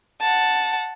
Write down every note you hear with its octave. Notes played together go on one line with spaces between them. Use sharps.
F#5 A5